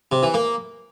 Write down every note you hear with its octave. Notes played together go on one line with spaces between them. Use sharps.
C3
E3
A#3